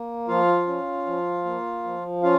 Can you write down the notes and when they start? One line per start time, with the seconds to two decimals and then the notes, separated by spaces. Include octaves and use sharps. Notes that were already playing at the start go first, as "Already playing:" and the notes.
Already playing: A#3
0.28 F3 F4 F5
0.67 C#4
1.06 F3
1.45 A#3
1.84 F3
2.23 C#4 F4 F5